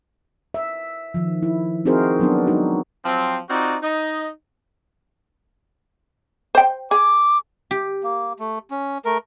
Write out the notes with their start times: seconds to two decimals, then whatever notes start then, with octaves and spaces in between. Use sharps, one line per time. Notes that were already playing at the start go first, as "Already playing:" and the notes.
0.54 E5
1.14 D#3 F3
1.43 E4
1.85 C4 D#4 F#4 G#4 A#4 C5
2.20 F#3 B3 D4
2.47 G#3 D4 D#4 F#4
3.05 F3 F#3 C4
3.49 C4 D#4 F4 F#4 D5
3.83 D#4 D#5
6.55 C5 G5
6.91 G#4 D6
7.71 G4
8.03 A#3
8.39 A3
8.71 C#4
9.05 A3 A#4